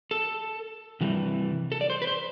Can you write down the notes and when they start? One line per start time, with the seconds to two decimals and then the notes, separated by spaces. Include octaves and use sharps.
0.11 A4
1.01 C3 E3 G3
1.72 A4
1.81 D5
1.90 C5
2.02 B4
2.07 C5